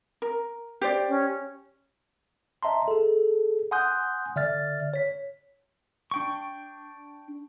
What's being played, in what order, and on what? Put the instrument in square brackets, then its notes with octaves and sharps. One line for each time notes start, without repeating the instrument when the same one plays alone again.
[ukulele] A#4
G4 C5 D5
[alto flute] C#4
[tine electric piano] D#5 E5 A5 A#5 C6
G#4 A4
F#5 G#5 C6 D#6 F#6 G6
D3 D5 E5 F6 A6
C#5 B6
[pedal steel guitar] D4 G5 C#6